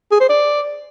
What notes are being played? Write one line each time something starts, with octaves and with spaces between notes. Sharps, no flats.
G#4
C5
D5